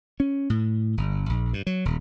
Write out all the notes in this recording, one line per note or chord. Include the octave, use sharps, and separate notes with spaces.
C#4
A2
G1
A#1
G2
F#3
D#1